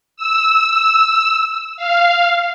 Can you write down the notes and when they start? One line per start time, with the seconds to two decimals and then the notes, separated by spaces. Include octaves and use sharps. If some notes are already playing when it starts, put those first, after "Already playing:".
0.17 E6
1.77 F5